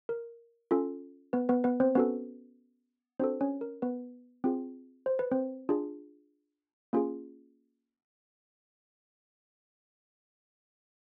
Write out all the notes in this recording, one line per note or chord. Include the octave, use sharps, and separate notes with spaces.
A#4
C#4 F4 A4
B3 B4
B3 B4
B3 B4
C4 C5
B3 C#4 F#4 A4 B4
C4 D4 F#4 A4 C5
C#4 C#5
A#4
B3 B4
C4 F4 G#4
C5
B4
C4 C5
D4 F4 G#4
A#3 C#4 F4 G#4